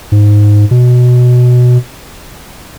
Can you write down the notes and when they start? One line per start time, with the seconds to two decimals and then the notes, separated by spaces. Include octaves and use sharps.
0.12 G#2
0.71 B2